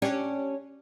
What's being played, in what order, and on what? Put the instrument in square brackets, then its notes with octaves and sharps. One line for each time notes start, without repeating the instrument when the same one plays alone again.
[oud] C#4 D4 G4